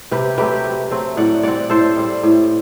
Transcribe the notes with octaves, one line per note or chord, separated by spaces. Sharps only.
C3 G4 B4
F#3 A3 C4 G4 B4
C3
F#3 A3 C4
A2 D5 F#5
G3 C4 D5 F#5
A2 A4 C5
G3 C4
A2